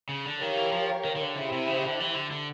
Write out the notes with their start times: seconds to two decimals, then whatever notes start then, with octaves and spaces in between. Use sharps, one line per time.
0.09 C#3
0.26 D3
0.41 D#3 G4 A#4 C#5 F5
0.57 E3
0.72 F3
1.05 D#3
1.16 D#3
1.21 D3
1.36 C#3 E4 G4 C5 E5
1.52 C3
1.67 C#3
1.84 D3
2.00 E3
2.15 D3
2.31 D3